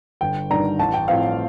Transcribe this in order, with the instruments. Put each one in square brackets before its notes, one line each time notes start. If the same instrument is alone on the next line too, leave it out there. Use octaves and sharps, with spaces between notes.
[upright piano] G1 G5
G2 D#3 G3 D4 A#5
A1 A5
G5
A2 F3 C4 F5